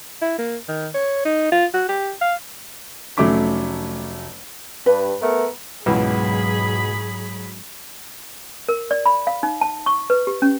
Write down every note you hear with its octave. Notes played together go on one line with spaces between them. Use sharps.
E4
A#3
D#3
C#5
D#4
F4
F#4
G4
F5
F1 F#3 A3 C#4 D6 B6
G2 B4
A3 B3 A#4
C#2 G#2 B2 E3 F#3 B3 G#4 B5
A#4
D5
B5
F5
D#4
A5
C#6
B4
G4
C#4